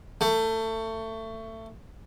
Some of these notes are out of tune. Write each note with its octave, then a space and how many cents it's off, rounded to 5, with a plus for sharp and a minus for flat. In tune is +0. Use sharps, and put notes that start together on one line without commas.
A3 +25